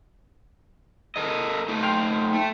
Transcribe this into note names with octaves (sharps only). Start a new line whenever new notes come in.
A4 A#4 D#5
A3 D#4
G5 C6 F6
A3